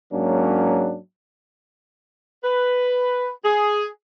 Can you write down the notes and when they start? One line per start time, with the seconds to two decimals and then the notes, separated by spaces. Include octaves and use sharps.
0.13 G#2 F#3 A#3 C#4 D4
2.44 B4
3.45 G#4